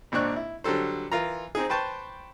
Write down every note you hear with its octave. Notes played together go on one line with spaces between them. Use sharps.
G#1 A#2 C4 D4 C#6 F#6
E4
D3 F#3 G3 A4 C5
E3 F4 A#4 A#5
C4 D#4 G#4
B4 C5 G5 A5 C#6